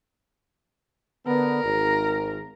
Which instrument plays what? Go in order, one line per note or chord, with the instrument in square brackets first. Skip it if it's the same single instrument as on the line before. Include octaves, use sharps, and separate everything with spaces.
[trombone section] D3 B3 [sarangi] A#4
[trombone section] G#1